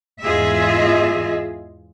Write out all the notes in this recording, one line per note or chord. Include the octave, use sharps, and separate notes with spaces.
E2 G#2 F4 G#4 D#5 E5